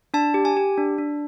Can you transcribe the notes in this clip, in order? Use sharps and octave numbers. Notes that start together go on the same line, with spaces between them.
D4 A5
G4
G#5
G4
D4
D4